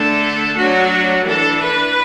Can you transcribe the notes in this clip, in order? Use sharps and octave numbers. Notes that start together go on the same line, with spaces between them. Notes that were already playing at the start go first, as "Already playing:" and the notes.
Already playing: D3 A3 D4 A4
F#3 A3 D4 F#4
E3 D4 A4
B4